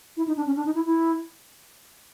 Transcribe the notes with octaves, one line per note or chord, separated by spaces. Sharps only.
E4
D#4
D4
C#4
D4
D#4
E4
E4